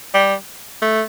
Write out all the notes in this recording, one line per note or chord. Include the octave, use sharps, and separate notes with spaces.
G3
A3